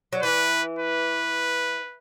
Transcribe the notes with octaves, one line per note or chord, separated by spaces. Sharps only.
F#3
E3 B4
B4